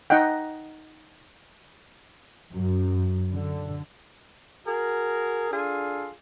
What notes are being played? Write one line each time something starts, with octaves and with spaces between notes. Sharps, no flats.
D#4 D#5 F#5 G5
F#2
D3
F#4 G#4 A#4
D4 F4 G#4 A4